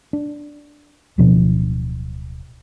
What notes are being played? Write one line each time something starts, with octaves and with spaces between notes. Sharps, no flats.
D4
D1 B2 F3 D4